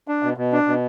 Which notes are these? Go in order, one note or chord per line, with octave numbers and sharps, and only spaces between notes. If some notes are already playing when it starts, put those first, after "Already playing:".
D4
B2
B2
D4
B2